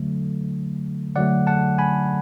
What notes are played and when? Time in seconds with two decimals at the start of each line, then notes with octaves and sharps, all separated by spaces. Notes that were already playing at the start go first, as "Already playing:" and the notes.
Already playing: D3 F#3 A3
1.16 D3 F#3 A3 D5 F#5
1.47 F#5 A5
1.78 G#5 B5